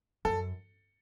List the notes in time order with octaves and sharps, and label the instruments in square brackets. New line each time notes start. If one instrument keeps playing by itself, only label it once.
[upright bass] F#2 [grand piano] A4